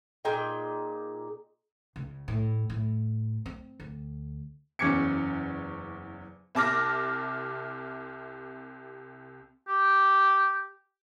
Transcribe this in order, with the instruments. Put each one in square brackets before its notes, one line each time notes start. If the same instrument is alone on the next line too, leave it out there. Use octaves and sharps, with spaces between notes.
[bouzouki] A#2 D#4 G#4 G5
[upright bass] C#2
A2
A2
C4
D2
[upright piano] F#1 E2 C#4 D6 G#6 C#7
[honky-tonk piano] C2 C3 A5 D6 F6 A#6
[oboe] G4